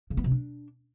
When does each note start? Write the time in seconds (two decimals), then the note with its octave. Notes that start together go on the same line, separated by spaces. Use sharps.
0.10 C#3
0.17 B3
0.24 C3
0.31 D4